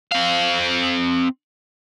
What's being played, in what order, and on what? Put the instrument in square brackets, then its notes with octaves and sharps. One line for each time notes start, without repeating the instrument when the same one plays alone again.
[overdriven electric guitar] C4 F5